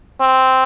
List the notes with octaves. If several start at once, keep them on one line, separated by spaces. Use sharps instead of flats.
C4